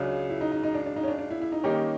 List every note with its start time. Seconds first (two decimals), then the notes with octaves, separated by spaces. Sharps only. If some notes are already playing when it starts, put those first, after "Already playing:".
Already playing: C#2 C#3 F#3 D4
0.30 E4
0.41 D#4
0.52 D#4
0.63 D#4
0.75 D4
0.86 D4
0.96 D#4
1.04 C#4
1.08 D4
1.19 D4
1.31 E4
1.41 E4
1.52 D#4
1.63 D#3 G3 A#3 C#4 D#4 G4